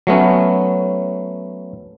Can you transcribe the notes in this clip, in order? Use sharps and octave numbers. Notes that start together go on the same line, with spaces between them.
F#3 A3 B3 C#4